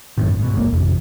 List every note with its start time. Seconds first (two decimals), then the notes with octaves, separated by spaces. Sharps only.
0.18 G1 F#2 A2 D#3
0.39 G#2 B2
0.54 F#1 B1 B2 A#3
0.72 A1 F2 C3